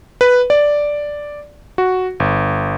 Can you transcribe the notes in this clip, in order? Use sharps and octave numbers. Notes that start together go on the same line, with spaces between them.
B4
D5
F#4
G1